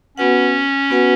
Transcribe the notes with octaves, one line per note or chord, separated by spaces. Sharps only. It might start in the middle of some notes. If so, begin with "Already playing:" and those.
B3 C#4 F#4 B4 F#5
B3 F#4 B4 F#5